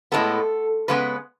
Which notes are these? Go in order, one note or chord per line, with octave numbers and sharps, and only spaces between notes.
A2 G#3 B3 A4
C#3 G#3 B3 B4